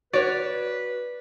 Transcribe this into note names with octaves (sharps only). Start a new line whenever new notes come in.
F#4 B4 C#5 D5